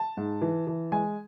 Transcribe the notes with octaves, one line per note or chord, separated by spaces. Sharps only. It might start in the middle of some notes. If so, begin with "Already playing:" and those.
Already playing: A5
G#2
E3
E3
G#3 G#5